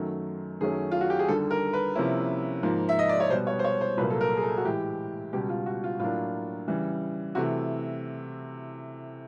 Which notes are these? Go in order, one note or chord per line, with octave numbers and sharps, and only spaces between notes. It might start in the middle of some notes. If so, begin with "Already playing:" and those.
Already playing: F#2 D#3 F#3 A3
F#2 D#3 F#3 A3 C#4 G#4
F4
F#4
G4
G#4
D#2 D3 G3 A4
A#4
B4
C3 F3 A#3 C#4 E4
G#2 F3 A#3
E5
D#5
D5
C#5
B2 G3 B3 C5
C#5
C5
C#5
C5
C2 A#2 F#3 A#3 B4
A4
A#4
G#4
A4
F#4
A2 E3 G#3 G4
C#2 B2 G3 G4
F4
F#4
F4
A2 F#3 A#3 D4 F4
C#3 E3 G3
C3 E3 A3 F#4